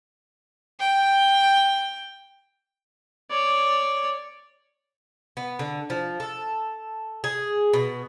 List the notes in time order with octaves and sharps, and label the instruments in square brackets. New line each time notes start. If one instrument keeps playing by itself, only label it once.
[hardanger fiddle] G5
[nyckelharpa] C#5 D5
[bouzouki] B3
D3
F3
A4
G#4
B2